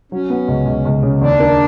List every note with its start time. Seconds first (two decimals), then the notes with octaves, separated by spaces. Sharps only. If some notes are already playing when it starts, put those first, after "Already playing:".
0.12 F#3 C#4
0.30 B3
0.48 C#2
0.66 C#2
0.85 C#2
1.03 C#3
1.21 D#2 D4
1.40 A#3